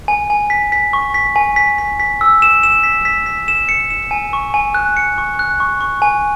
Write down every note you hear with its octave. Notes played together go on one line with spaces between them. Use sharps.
G#5
G#5
B6
B6
C#6
B6
G#5
B6
B6
B6
E6
E7
E7
B6
B6
B6
E7
C#7
E7
G#5
C#6
G#5
F#6
C#7
C#6
F#6
C#6
C#6
G#5